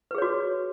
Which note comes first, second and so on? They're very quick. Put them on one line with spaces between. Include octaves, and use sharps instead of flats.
B4 G#4 C#5 F#4